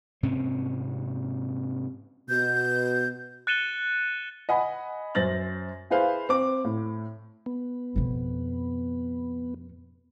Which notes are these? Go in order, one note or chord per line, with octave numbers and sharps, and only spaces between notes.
G#2 C3 C4 C#4
B2 G6
F#6 A6 C#7 D#7 E7 G7
D#5 F#5 G#5 B5
F#2 C5 A6 A#6 F#7
E4 G#4 B4 C5 F5
C4 D6
A2
B3
F2 B2